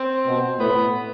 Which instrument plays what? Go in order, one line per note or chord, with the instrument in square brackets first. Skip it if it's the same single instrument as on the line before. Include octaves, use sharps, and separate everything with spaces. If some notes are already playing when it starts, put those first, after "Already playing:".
Already playing: [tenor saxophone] C4
[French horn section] B2
[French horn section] A2 [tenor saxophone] B3